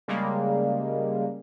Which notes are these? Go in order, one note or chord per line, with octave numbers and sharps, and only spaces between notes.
C#3 G3 G#3 A#3